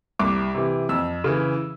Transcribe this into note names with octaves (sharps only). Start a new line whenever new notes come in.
C2 D6
C3 E3
F2 E6
C#3 E3